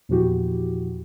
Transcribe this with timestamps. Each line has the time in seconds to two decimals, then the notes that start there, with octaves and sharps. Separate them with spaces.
0.09 E2 A#2 F3 E4 F#4 G4